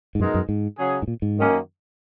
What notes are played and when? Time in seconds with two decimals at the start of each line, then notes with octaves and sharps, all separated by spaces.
0.15 G#2
0.20 F#2 B2 G#3 D#4 A#4
0.34 F#2
0.49 G#2
0.78 C#3 F#3 C#4 G#4
1.02 G#2
1.08 A#2
1.22 G#2
1.37 F#2 D#3 A#3 C#4